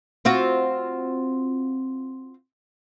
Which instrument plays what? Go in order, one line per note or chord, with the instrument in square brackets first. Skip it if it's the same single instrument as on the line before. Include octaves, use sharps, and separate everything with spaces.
[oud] C4 F4 F#4